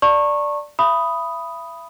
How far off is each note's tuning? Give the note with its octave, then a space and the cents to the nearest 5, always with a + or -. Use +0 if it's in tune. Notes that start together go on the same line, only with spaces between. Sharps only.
D5 +0 A5 +40 C#6 -20
E5 +35 B5 +0 D#6 +0